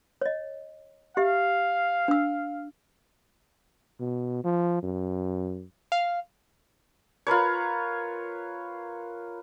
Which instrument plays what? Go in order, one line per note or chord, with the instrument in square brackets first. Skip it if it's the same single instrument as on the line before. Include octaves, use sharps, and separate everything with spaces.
[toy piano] C#5 D#5
[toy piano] G4 E5 [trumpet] F5
[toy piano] D4 E6
[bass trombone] B2
F3
F#2
[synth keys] F5
[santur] F4 A#4 B4 C#5